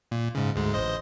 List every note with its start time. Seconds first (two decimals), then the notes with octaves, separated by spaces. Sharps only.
0.11 A#2
0.35 G#2 C#3
0.56 D2 G#2 G#3
0.74 A1 C5 D#5